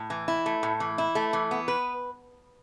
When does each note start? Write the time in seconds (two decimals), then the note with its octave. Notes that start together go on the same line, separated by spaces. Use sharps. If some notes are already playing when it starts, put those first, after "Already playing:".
Already playing: A2
0.10 E3
0.28 E4
0.46 A3
0.63 A2
0.80 E3
0.98 E4
1.15 A3
1.33 E3
1.51 B3
1.68 B4